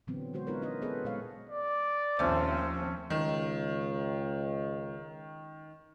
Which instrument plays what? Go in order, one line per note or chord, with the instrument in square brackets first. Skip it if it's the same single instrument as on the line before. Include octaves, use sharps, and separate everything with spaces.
[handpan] A#2 D3 E3 F#3 B3 C4
D3 G#3 F#4 C5
B3 D#4 F4 A#4 B4 C#5
C#4 E4 A#4 D#5
B3 G#4 A4 B4 C5
A#2 G#3 C#5 F5 F#5
[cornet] D5
[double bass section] D#2 F3 C4 [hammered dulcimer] A3 C#4 [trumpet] C5
[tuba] C#2 [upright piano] D#3